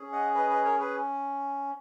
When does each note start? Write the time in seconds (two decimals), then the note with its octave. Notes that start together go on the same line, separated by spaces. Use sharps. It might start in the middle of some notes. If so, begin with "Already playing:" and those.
Already playing: C#4 G#4
0.12 D#5 F#5
0.35 B4 D#5
0.50 B4 D#5
0.65 A#4 C#5
0.80 G#4 B4